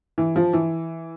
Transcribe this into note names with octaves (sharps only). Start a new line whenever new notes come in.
E3
F3
E3